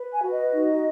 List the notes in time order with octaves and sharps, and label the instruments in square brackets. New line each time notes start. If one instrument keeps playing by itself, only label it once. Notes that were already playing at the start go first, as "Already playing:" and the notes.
Already playing: [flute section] B4
G#5
F#4
D#5
D#4